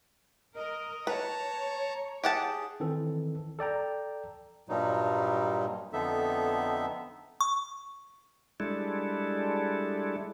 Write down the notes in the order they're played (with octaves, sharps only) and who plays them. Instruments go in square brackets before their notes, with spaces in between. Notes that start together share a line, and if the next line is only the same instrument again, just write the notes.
[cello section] A#4 [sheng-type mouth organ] D#5
[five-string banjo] B4 [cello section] C#5 [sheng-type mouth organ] A5 A#5
[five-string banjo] G4 F#5 A5 [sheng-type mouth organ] G#4
[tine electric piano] D#3 E3 C4 A4
A4 D5 G5 A#5
[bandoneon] G2 A#2 F#3 G3 D#4
F2 D3 B3 D#4 A4 E5
[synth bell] C#6
[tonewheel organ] G3 G#3 D4 E4 A4